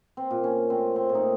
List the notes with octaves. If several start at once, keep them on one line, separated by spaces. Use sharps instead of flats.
C4
A#2
C#4
A3 C4
C4
A#2
D#4